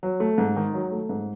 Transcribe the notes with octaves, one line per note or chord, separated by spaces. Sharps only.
F#3
A3
G#2
D#3
F#3
A3
G#2